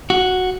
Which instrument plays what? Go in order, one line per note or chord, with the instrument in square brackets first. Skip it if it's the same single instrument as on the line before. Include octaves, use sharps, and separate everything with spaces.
[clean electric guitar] F#4